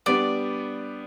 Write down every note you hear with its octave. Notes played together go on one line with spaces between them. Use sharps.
G3 B3 D4 D5